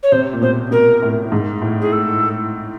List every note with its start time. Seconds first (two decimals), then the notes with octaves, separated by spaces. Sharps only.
0.03 C#5
0.12 C3 C5
0.33 A#2
0.42 B2 C5
0.71 B2 A#4
1.02 A2
1.32 G#2
1.62 A2
1.81 G#4
1.92 A4